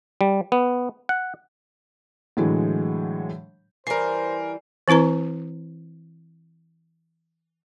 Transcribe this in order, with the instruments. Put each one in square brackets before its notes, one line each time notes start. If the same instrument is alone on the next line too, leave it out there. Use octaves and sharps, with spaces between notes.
[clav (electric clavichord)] G3
B3
F#5
[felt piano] A2 D3 E3 F#3 G#3
[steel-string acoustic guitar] E3 G3 [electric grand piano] A#4 C7 [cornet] C5 [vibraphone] G#5
[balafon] E3 C4 E4 B4 A#5